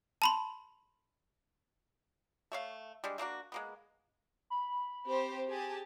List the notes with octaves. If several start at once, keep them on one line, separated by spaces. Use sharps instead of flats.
A5 B5 C6
A3 C#5 F5
G3 G#3 D4
A3 A#3 D4 F#4
G#3 A#3 B3
B5
C4 G4 C5
G4 G#4 A5